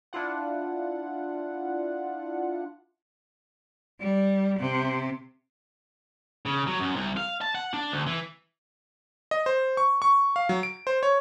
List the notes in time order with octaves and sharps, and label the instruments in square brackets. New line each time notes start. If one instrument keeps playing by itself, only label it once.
[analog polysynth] D4 E4 F4 F#5
[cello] G3
C3
[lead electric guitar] C#3
F#3
F#2
C2
F5
A5
F#5
D4
D2
E3
[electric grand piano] D#5
C5
C#6
C#6
F5
F#3
D7
C5
C#5